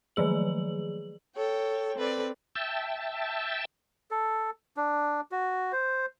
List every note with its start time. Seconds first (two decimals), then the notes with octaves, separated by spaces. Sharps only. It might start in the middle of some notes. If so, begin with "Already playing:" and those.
0.16 D#3 F3 F#3 G#4 F#7
1.34 A4 C#5 G5
1.97 C4 A4 B4 D5
2.56 E5 G5 A5
4.11 A4
4.77 D4
5.32 F#4
5.72 C5